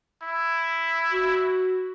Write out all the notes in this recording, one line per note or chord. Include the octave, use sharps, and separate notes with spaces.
E4
F#4